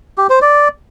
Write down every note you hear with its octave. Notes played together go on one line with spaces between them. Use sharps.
G4
C5
D5